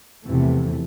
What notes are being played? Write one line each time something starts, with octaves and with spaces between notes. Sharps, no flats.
F1 E2 C3 E3 A3